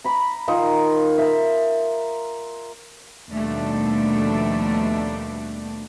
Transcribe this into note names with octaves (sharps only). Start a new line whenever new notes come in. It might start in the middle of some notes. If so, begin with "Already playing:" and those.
A#5 B5 D6
D#3 D#4 F4 A#4
A#4 E5
D#2 B2 F3 G3 A3 D4